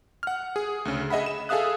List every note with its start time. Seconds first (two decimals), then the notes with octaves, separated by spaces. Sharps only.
0.23 F#5 F6
0.56 G#4
0.85 D2 C#3
1.10 G#4 D#5 E5 F#5 B5
1.26 E7
1.49 G#4 A4 E5 F5 D#6 F#6